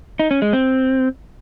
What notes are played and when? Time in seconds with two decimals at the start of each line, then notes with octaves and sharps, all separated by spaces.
0.19 D#4
0.31 C#4
0.42 G#3
0.53 C4